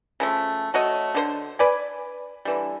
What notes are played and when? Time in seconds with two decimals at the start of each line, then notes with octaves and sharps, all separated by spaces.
0.20 C#3 F3 A3
0.74 A3 F#4 C#5 D#5
1.15 D3 E3 C5
1.59 B4 D5 G#5
2.45 D3 E3 G3